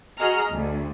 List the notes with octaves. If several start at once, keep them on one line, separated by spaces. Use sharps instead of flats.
F#4 G#4 D#5 A#5 F6
D2